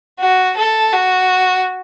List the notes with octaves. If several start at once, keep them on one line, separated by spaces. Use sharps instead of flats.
F#4
A4
F#4